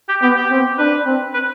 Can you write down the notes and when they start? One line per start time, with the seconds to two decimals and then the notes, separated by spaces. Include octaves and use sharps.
0.08 G4
0.22 B3 G4
0.36 G4
0.51 C4
0.78 D4 B4
1.05 C4
1.33 B4